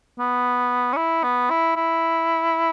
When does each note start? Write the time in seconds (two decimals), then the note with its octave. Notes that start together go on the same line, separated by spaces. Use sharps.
0.19 B3
0.93 C#4
0.97 E4
1.23 B3
1.50 E4
1.76 E4